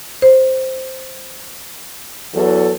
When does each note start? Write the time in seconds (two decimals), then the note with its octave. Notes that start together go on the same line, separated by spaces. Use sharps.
0.22 C5
2.33 E2 F#3 A4